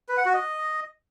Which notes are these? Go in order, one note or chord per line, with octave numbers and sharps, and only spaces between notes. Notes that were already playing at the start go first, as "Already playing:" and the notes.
B4
F#5
F#4
D#5